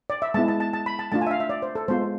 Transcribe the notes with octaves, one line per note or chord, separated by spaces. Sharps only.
D5
E5
G#3 B3 E4 A5
A5
A5
A5
B5
A5
A3 D4 F4 A5
G#5
E5
F5
E5
D5
C5
A4
G#3 B3 F4 C5